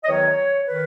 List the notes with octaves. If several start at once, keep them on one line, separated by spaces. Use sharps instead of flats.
D#5
E2 D#3 F#3 C#5
D#3 B4